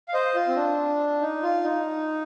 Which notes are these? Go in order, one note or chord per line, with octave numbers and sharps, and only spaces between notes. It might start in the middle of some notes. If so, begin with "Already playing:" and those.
F5
C5 D#5
F4
C4
D4
D#4
F4
D#4